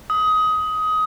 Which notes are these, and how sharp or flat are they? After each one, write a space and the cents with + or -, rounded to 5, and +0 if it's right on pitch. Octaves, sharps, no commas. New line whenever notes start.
D#6 +20